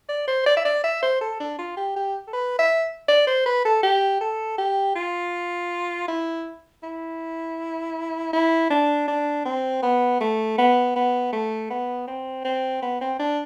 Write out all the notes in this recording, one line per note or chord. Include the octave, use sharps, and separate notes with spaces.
D5
C5
D5
E5
D5
E5
C5
A4
D4
F4
G4
G4
A4
B4
E5
D5
C5
B4
A4
G4
A4
G4
F4
E4
E4
E4
D4
D4
C4
B3
A3
B3
B3
A3
B3
C4
C4
B3
C4
D4